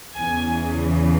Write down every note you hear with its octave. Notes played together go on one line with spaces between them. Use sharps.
E2 C#3 E3 G#5